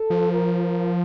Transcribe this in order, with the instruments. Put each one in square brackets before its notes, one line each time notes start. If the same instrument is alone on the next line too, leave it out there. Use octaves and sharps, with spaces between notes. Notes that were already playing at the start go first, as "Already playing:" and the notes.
Already playing: [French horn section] A4
[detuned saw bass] F3
[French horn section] A#4
A#4